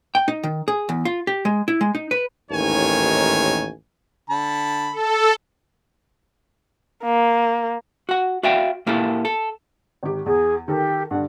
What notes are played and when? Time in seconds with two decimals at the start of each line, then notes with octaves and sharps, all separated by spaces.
0.15 G5
0.28 D#4
0.43 D#3
0.68 G#4
0.89 E2
1.05 F4
1.27 G4
1.45 G#3
1.68 E4
1.81 G#3
1.95 D#4
2.11 B4
2.51 A1 D#2 G#2 D#3 C#5 G#5
4.30 D3 A5 B5
4.92 A4
7.04 A#3
8.09 F#4 F#5
8.43 F#4 D5 E5 F5 G5
8.87 A#2 A#3 E4 G4 A4
9.25 A4
10.03 G#1 G4
10.26 E2 G#4
10.68 D#3 G4 A4 A#4
11.11 G2 D3 F#5